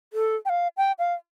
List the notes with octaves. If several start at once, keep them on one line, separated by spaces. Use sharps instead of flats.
A4
G5
F5
G5
F5